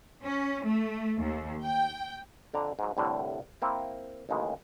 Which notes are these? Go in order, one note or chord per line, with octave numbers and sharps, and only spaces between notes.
C#4
A3
D#2
G5
F2 D3 D5 A#5
G#2 F#3
C2 A2 D3 G3
A#3 C4 E4
A1 D#2 C#3 G#3